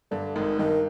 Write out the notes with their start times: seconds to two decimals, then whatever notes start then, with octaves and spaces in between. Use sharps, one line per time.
0.11 G2 D3
0.35 G#1 G#2 D#3
0.59 G2 D#3